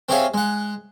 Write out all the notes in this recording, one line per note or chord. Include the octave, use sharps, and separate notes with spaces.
C4 G4 G#4 C#5 E5 F5
G#3 F#5